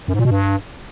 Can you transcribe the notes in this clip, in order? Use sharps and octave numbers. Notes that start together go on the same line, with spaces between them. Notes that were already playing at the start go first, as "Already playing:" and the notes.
F#2
G#2
A#2
B2
G2